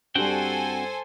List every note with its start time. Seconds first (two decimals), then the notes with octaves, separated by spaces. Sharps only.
0.15 G2 G3 C4 F#4 A4 C5 G5 G#5